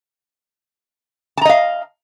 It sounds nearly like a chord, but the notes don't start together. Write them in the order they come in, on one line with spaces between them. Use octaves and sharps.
A5 A#5 D#5 F5